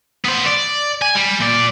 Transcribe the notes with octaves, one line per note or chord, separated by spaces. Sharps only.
B3 C5
D5
G#5
G3
A#2 D5